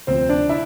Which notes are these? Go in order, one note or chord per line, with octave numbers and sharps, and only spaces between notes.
D2 C3 F3 C4 C5
D4 D5
E4 E5